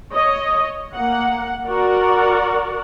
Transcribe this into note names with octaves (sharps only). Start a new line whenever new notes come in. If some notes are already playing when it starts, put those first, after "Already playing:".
C#5 D#5
A#3 F#5
F#4 A#4 D5 F#5